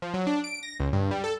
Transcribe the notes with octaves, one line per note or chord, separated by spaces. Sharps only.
F3
F#3
D4
D7
A#6
C#2
G2
G3
A4